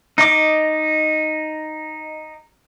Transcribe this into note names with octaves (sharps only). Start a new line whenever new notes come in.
D#4 D#5 D6